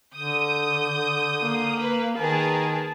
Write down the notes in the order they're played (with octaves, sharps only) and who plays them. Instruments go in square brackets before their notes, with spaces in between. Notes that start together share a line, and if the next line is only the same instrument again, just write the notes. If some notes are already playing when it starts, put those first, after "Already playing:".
[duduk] D3 [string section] D#6 G6
[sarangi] A#3
[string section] B4
[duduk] D#3 [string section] G#4 A#4 B4 [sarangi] A5